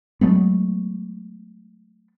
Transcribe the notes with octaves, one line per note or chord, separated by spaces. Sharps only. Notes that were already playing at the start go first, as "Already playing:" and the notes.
F#3 G#3 A3 B3